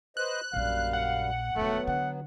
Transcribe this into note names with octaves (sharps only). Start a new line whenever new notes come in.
B4 C5 D#5 F#6
A#1 F#2 A#2 G3 F5
F#5
E1 D#2 F#3 A3 B3
D3 F#5